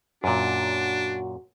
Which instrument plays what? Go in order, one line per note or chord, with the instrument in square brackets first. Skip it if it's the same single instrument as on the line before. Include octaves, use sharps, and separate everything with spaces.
[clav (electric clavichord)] F#2 A#2 [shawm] D4 [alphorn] F#4